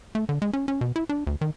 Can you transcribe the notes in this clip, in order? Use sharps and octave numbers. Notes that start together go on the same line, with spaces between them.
A3
D3
G#3
C#4
C#4
B2
E4
D4
D2
D#3